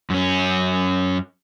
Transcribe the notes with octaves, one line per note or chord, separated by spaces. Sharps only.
F#2 C#4